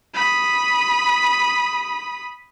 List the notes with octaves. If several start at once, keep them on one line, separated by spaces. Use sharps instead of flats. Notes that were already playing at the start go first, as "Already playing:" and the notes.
B5 D#6